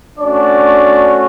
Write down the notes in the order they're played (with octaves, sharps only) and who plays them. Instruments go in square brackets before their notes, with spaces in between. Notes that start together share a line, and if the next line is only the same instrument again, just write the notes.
[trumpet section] A3 C#4 D4 F#4 D5